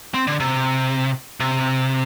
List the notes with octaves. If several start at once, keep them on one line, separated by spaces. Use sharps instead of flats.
C4
D3
C3
C3